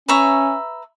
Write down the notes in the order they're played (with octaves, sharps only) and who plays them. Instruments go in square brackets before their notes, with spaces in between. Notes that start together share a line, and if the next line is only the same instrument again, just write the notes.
[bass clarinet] C#4 [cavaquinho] B4 E5 A#5 C#6